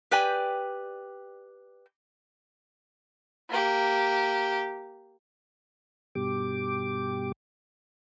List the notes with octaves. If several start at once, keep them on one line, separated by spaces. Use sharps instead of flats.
G4 B4 D5 G5 G#5
A#3 G4
G2 B2 G4 D6